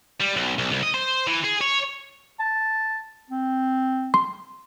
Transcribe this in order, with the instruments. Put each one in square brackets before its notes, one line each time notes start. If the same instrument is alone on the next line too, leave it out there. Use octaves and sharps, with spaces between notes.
[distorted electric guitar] G3
B1
B1
C2
D#5
C5
E3
G#4
C#5
[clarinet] A5
C4
[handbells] C6